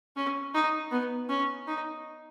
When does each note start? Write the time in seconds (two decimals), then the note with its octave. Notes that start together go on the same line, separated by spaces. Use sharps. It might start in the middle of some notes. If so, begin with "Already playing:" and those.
0.16 C#4
0.54 D#4
0.91 B3
1.29 C#4
1.67 D#4